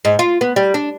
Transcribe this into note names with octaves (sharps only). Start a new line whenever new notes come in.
G#2
F4
B3
G3
D4